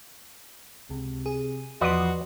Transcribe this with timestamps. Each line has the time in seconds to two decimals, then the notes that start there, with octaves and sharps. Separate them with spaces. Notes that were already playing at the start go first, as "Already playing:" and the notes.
0.90 C#2 C3
1.26 G#4
1.81 E2 F3 F#4 B4 D5 D#5 C6